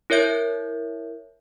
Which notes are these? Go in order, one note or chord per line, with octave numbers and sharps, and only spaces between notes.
E4 A#4 C#5 E5 G6